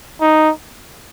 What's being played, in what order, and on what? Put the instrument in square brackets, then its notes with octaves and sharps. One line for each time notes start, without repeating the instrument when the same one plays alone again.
[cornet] D#4